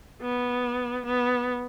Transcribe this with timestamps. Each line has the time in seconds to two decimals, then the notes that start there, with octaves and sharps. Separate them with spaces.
0.22 B3
1.06 B3